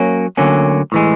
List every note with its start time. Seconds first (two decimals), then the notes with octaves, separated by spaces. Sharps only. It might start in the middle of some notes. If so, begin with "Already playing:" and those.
Already playing: F#3 A#3 C#4
0.37 D2 D3 F#3 A#3 C#4
0.92 A2 E3 G#3